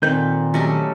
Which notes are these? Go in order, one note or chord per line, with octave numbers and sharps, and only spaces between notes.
A#2 D#3 A#3 C4 A4 B4 G6
F#3 A3 C#4 G4 A4 D#5